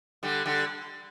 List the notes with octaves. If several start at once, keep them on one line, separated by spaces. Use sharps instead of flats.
D3 G3
D3 G3